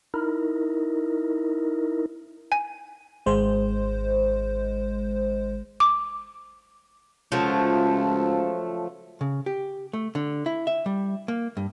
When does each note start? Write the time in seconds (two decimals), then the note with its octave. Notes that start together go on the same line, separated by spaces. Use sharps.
0.14 D#4 E4 A#4
2.52 G#5
3.26 G#1 G#3 C5
5.80 D6
7.32 C#2 F3 F#3 A3
9.21 C#3
9.46 G4
9.93 A3
10.15 D3
10.46 E4
10.67 E5
10.86 G3
11.28 A#3
11.57 G2